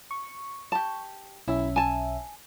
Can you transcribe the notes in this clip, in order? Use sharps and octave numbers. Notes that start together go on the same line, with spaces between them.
C#6
G4 A5
B1 C#4 E4 E5
G#5 A5